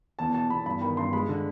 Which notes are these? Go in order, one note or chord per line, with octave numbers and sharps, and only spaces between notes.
E2 A5
B2 A5
E2 B5
G2 B5
D#3 B5
G2 C6
G#3 B5
D3